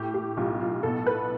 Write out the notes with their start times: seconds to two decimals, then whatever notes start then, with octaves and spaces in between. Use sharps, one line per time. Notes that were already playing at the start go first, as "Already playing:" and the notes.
Already playing: A2 G4
0.14 G4
0.37 B1 F4
0.60 F4
0.83 B2 A4
1.06 B4